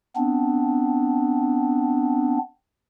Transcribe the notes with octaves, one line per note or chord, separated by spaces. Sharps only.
B3 C4 D4